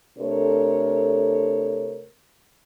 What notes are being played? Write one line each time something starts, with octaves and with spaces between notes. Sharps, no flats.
C3 A3 D4 A4 A#4 C#5